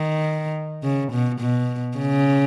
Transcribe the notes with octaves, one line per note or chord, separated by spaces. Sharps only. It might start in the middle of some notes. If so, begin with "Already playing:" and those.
Already playing: D#3
C#3
B2
B2
C#3